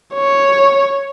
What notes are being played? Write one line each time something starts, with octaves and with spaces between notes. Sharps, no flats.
C#5